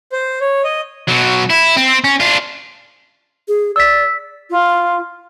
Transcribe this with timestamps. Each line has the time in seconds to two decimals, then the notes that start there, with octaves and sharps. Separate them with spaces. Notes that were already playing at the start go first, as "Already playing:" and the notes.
0.12 C5
0.41 C#5
0.64 D#5
1.08 B2 F#3
1.50 E4
1.77 C4
2.04 C#4
2.20 D4 F4
3.48 G#4
3.76 D5 E6 B6
4.50 F4